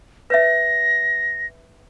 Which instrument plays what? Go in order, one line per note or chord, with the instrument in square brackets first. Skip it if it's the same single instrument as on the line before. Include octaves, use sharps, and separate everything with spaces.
[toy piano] B4 C#5 E5 [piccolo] A#6